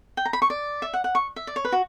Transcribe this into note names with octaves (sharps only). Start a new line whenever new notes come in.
G5
A#5
B5
C#6
D5
E5
F#5
F#5
C#6
E5
D5
C#5
B4
F#4